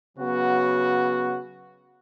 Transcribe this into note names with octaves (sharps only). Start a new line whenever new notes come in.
C#3 F#3 B3 F#4